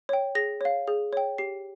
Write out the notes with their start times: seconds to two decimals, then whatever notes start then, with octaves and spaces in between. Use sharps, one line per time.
0.09 C#5 G5
0.35 G#4 A#6
0.61 C#5 F5
0.87 G#4
1.13 C#5 G5
1.38 G4 C7